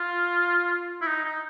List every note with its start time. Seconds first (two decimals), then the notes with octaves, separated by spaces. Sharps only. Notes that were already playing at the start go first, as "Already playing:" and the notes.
Already playing: F4
1.02 E4
1.08 D#4
1.25 D#4